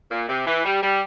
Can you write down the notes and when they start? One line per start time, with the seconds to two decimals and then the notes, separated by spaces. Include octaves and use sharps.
0.10 A#2
0.29 C3
0.46 E3
0.64 G3
0.82 G3